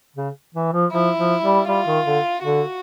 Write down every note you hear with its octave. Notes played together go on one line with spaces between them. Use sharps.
C#3
E3
F3
F3 E4
F3
G3
G3 F4
D#3
D3
D3 F#4